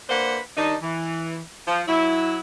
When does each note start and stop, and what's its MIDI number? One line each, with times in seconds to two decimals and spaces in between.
0.09 0.38 58
0.09 0.38 62
0.09 0.38 71
0.09 0.38 72
0.09 0.38 78
0.56 0.75 51
0.56 0.75 55
0.56 0.75 62
0.56 0.75 63
0.82 1.38 52
1.67 1.81 53
1.87 2.38 54
1.87 2.38 64